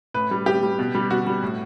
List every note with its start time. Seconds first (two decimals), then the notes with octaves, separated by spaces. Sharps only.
0.14 A2 B4
0.31 G3
0.46 A2 G4
0.63 G3
0.79 B2
0.95 G3
1.11 B2 F#4
1.27 G3
1.42 A2